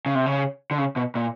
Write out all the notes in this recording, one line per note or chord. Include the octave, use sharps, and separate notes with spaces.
C#3
C3
C#3
D3
C#3
B2
A#2